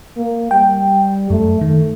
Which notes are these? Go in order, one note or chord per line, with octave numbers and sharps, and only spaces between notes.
A#3
G3 G5
F#2 A3
D#3 A3